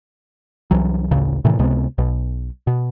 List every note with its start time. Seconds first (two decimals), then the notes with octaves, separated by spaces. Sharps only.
0.71 C2 E3 F#3
1.11 A1 D2 C#3
1.45 A2 C3 D#3 E3
1.59 C#2 C3 G#3 B3
1.98 B1 B2
2.67 B2